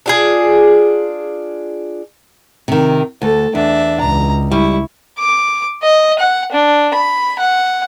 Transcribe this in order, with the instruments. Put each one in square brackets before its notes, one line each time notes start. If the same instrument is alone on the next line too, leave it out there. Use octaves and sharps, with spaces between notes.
[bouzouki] D4 F4 G#4
[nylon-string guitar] C3 D#3
[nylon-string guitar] D2 [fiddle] A4
[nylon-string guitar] E2 [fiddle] D4 E5
[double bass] C#2 [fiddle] A#5
[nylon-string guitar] G3 [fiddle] E4 C#6
[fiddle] D6
D#5
F#5
D4
B5
F#5